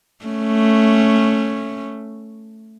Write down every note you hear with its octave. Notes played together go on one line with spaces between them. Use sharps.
A3 C#4